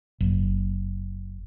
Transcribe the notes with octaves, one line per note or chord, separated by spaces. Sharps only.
F#1